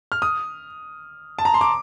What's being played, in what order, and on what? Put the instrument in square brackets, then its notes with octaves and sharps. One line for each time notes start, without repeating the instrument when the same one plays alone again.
[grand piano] F6
D#6
A5
A#5
C6
D6